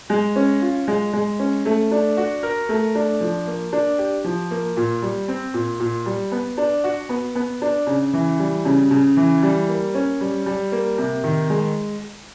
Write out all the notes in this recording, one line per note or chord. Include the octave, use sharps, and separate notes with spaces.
G#3
C#4
F4
G#3
G#3
C#4
A3
D4
F#4
A#4
A3
D4
F3
A#3
D4
G4
F3
A#3
A#2
G3
C4
A#2
A#2
G3
B3
D4
F#4
B3
B3
D4
C#3
E3
G3
C#3
C#3
E3
G3
A#3
C#4
G3
G3
A#3
C3
D#3
G#3